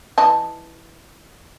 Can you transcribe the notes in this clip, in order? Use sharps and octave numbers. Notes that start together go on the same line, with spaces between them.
E3 D#5 A5